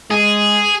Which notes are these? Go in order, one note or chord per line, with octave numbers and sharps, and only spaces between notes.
G#3 G#4